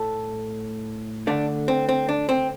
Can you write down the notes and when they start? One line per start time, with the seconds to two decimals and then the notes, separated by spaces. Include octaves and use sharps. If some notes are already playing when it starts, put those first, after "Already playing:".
Already playing: A2 A3 A4
1.27 D3 A3 D4
1.68 C4
1.89 C4
2.09 D4
2.29 C4